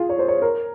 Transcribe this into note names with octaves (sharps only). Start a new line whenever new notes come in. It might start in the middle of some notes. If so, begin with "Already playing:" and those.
Already playing: F4 G#4
C#5
C5
C#5
A#4